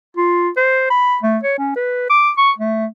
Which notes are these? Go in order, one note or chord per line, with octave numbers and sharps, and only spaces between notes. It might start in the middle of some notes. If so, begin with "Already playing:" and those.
F4
C5
B5
A3
C#5
C#4
B4
D6
C#6
A3